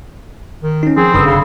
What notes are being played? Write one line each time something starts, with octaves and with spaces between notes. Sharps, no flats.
D#3
C#4 D#4
F3 C4 G#4
F#1 G2 D3 B5 D#6 E6
C#3